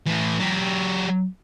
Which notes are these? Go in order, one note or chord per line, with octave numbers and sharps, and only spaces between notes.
A2 E3
F#3 G4